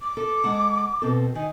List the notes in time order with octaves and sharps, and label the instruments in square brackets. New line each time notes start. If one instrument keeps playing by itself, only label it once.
[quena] D6
[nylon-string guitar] A4
G#3 F#5 A5
B2 C4 A4
[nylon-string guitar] D#3 [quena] G#5